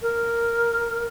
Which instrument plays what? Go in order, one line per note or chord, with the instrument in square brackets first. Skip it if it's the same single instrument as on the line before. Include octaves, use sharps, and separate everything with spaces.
[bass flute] A#4